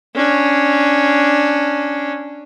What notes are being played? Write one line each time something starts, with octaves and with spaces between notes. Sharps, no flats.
C#4 D4